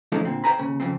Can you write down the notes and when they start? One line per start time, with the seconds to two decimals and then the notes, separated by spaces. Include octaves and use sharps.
0.12 F3 G#3 A3 C#4 D#4 E4
0.25 A#2 D3 C4
0.44 C5 D#5 G5 G#5 A#5 B5
0.58 D#2 C#3
0.80 F2 C#3 C4